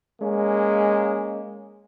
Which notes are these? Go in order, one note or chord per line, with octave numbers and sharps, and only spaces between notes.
G#3 A#3 C#4